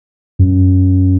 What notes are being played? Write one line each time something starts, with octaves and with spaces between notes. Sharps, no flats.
F#2